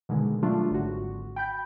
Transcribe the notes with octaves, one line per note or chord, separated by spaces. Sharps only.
B2 D3 D#3 G#3
F#3 G3 A3 D4 F4
G#1 D3 F#4
G5 B5 G6